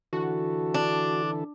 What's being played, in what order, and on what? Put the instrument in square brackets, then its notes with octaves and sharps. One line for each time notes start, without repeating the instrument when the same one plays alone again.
[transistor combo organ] D3 E3 A4 [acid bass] F#4
[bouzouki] D4